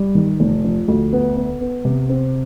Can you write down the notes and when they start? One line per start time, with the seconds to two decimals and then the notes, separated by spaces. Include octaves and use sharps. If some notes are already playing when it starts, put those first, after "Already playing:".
Already playing: G3
0.15 D#3
0.40 F1
0.64 F3
0.88 D2
1.13 B3
1.37 B3
1.61 B3
1.85 C3
2.09 C4